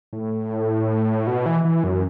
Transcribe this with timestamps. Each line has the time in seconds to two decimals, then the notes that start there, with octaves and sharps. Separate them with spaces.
0.13 A2
1.27 B2
1.46 E3
1.65 E3
1.84 F#2